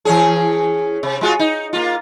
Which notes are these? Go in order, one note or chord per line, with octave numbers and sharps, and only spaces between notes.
E3 C#4 G#4
C3
G#3 F4 F#4
D#4
A#3 F4